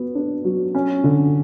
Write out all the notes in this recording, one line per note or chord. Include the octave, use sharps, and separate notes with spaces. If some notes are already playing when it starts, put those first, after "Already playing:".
Already playing: B3 F#4
D4
F#3
C#4
D3